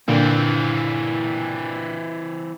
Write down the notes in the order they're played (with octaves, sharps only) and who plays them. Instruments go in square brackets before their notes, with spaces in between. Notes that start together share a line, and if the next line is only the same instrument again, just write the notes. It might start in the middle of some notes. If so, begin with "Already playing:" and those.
[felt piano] A#2 D3 [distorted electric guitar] E3 C4